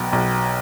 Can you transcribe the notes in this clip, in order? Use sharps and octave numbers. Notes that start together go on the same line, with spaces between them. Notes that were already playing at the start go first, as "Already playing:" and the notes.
Already playing: B1 B3 G5
B1